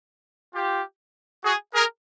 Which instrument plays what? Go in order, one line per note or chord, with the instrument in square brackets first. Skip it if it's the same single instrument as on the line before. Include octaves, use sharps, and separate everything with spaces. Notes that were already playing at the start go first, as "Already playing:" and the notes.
[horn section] F4 G4
F#4 G#4
G#4 A#4